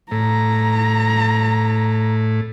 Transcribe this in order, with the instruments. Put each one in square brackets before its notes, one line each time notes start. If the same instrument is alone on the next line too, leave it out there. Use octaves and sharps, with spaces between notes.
[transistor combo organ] A2 [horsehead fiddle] A#5